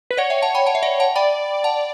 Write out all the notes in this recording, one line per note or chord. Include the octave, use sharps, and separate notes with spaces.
B4
C#5 D5 F#5
E5 G5
F#5 A5
G5 B5
F#5 A5
E5
D5 F#5
F#5 A5
D5 G5 B5
F#5 A5